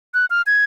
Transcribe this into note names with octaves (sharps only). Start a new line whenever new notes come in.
F#6
F6
G#6